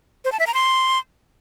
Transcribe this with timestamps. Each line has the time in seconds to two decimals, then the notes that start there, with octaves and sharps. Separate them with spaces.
0.25 C5
0.32 A5
0.40 E5
0.47 A#5
0.54 C6